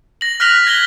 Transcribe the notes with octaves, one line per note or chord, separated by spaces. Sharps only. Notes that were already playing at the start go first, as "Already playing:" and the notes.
A#6 F#7
F6 F#6 A#6 B6 F7 F#7
G#6 B6 G7